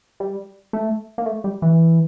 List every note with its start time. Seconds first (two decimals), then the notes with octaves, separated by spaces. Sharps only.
0.20 G3
0.73 A3
1.18 A#3
1.26 A3
1.44 G3
1.62 E3